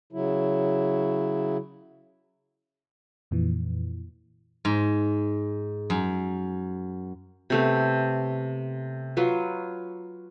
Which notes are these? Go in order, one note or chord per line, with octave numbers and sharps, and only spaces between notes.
C#3 F#3 E4
F2 A#2 E3
G#2
F#2
C3 A3 B3
F#3 F4 B4